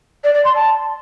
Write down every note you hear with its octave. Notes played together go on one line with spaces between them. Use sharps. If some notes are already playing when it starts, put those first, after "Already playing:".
D5
D5
C6
A5